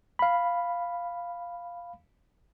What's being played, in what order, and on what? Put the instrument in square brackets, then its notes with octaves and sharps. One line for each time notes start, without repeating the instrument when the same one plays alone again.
[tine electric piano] F5 B5